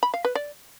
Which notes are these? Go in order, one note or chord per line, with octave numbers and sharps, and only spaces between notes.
B5
F5
B4
D5